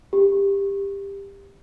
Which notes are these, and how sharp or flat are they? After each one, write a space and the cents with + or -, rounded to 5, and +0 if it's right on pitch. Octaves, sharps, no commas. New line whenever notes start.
G4 +20